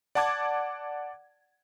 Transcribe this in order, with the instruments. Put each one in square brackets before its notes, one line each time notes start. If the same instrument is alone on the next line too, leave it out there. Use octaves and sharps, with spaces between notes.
[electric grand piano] D5 F#5 A5 D6 G#6